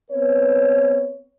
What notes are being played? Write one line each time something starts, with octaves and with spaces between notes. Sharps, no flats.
B3 C4 B4 C#5